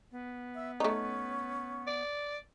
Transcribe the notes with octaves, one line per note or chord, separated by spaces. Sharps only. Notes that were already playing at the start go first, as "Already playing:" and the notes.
B3
E5
A3 C#4 D#4
D5